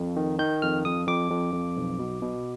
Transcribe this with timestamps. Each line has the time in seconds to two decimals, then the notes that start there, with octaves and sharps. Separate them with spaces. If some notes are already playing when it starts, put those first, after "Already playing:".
Already playing: F2
0.16 D#3
0.39 D#3 G6
0.62 F2 F6
0.85 F2 D#6
1.08 F2 D6
1.31 F2
1.54 F2
1.77 B1
1.99 B2
2.22 B2